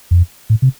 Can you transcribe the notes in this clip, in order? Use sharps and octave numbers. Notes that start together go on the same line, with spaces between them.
F2
A2
C3